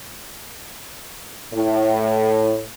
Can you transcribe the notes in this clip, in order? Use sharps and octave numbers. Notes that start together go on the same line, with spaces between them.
A2